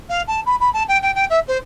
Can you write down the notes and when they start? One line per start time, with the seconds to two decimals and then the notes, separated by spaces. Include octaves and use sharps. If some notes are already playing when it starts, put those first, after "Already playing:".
0.09 F5
0.27 A5
0.46 B5
0.60 B5
0.73 A5
0.88 G5
1.02 G5
1.15 G5
1.30 E5
1.48 C5